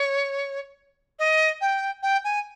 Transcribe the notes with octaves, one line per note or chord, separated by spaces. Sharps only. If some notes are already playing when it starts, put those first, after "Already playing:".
Already playing: C#5
D#5
G5
G5
G#5